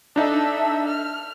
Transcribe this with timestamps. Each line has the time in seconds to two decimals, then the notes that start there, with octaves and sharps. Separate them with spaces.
0.16 D4 D#4 A4 E5
0.88 F6